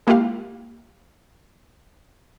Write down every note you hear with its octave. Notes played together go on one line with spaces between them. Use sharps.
G#3 A#3 E4 F4 G4 F5